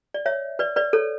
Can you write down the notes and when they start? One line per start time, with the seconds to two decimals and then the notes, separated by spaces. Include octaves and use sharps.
0.14 D5
0.26 C#5 E5
0.59 B4 D5
0.76 B4 D5
0.93 A4 C#5